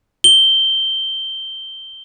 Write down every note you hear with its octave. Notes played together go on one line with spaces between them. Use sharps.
G7